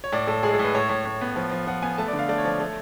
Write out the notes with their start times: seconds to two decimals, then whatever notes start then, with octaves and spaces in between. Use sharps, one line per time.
0.04 C#5
0.12 A2 D5
0.27 A2 A4
0.43 G#3 G#4
0.54 A4
0.59 A2 B4
0.75 A2 C#5
0.90 A2
1.05 A2
1.21 B3
1.36 F3
1.51 F3
1.67 F3 F#5
1.82 B3 G#5
1.98 A3 A5
2.08 D5
2.13 D3
2.19 F5
2.29 A3 D5
2.38 C#5
2.45 F3 D5
2.60 A3 C#5